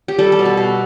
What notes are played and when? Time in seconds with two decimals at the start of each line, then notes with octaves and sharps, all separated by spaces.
0.08 G4
0.19 G3 A4
0.32 A4
0.39 B2
0.46 B4
0.57 B2